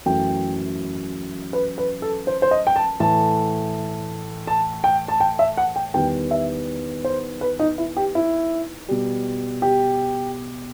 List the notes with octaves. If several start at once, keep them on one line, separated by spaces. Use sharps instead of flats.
F#2 E3 A3 G5
B4
B4
A4
C5
C5
D#5
G5
A5
A2 E3 A3 A5
A5
G5
A5
G5
E5
F#5
G5
E2 D#3 G3 G5
E5
C5
B4
D#4
E4
G4
E4
B2 G3
G4